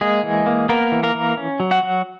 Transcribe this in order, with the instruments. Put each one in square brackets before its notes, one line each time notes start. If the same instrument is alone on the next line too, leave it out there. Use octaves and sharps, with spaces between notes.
[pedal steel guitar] G#3 A#3 G#4
E3
A#3
A#3 B3 A#4
E3
A#3 A#4
E3
C#4
F#3
F#4 F#5
F#3